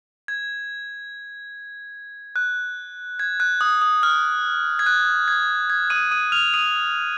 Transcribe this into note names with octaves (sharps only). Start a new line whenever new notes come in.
G#6
F#6
G#6
F#6
D#6
D#6
F6
G#6
F#6
G#6
G#6
D#6 D#7
D#6 D#7
F6 F7
D#6 D#7